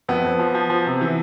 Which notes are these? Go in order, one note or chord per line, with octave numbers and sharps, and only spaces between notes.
F2 B3
F2
F3
F3
F3
C3
E3